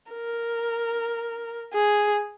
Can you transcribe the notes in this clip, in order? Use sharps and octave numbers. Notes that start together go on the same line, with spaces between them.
A#4
G#4